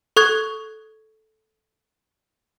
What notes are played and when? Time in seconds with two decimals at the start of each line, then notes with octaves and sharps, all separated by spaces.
0.16 A4 C#6 F#6 G#6